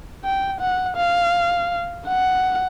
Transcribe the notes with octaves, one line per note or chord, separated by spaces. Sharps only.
G5
F#5
F5
F#5